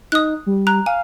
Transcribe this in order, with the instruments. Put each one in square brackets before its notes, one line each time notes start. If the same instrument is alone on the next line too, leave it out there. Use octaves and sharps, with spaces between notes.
[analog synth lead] D#4 [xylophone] D#6 F#6
[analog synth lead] G3
[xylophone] A#5 F#6
[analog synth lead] F5 [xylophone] G#5